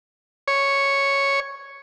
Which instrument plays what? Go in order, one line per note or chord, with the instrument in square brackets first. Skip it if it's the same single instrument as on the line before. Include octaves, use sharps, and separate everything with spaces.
[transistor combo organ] C#5